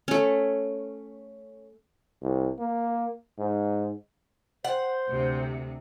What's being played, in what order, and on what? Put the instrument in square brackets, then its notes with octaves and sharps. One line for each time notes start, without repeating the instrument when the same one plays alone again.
[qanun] A3 C#4
[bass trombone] C2
A#3
G#2
[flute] C5 [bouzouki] F#5
[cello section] D2 C3